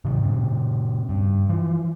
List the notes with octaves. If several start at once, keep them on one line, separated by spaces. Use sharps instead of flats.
G#2 C3 D#3 F#3
A#2 C#3
G2
E3 F3